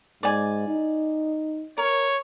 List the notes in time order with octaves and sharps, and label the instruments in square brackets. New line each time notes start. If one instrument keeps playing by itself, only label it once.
[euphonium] G#2 [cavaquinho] D5 G#5
[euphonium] D#4
[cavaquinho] A#4 [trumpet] C#5